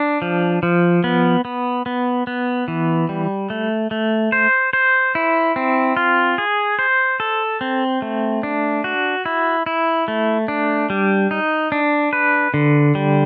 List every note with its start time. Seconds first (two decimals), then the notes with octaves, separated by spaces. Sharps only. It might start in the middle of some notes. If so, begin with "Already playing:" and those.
Already playing: D4
0.22 F3
0.63 F3
1.04 B3
1.45 B3
1.86 B3
2.27 B3
2.68 E3
3.09 G3
3.50 A3
3.91 A3
4.32 C5
4.73 C5
5.15 E4
5.56 C4
5.97 F4
6.38 G#4
6.79 C5
7.20 A4
7.61 C4
8.02 A3
8.43 D4
8.84 F#4
9.26 E4
9.66 E4
10.08 A3
10.48 D4
10.90 G3
11.31 D#4
11.72 D4
12.13 B4
12.54 D3
12.95 G3